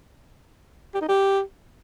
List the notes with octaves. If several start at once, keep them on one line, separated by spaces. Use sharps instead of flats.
G4
D#4
G4